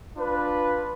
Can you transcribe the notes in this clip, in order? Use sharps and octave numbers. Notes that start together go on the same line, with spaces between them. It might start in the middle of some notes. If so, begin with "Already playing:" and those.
D4 F4 B4